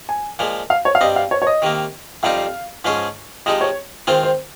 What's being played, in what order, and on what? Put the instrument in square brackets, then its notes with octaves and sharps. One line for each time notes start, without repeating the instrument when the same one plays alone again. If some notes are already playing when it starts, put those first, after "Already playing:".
[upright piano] G#5
[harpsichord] A#2 F3 G#3
[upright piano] F5
C#5
F5
[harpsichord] G2 G3 C4 [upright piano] D#5
[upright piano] F5
C#5
C#5
D#5
[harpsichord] C3 D#3 A#3
[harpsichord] F2 C3 G3 C4 D#4 [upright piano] F5
[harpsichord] G#2 F3 G#3 C#4 G#4
[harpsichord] C3 F3 G#3 D#4 [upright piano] D#5
[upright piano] C#5
[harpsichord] D#3 G#3 C4 F4 [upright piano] C5
[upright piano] C5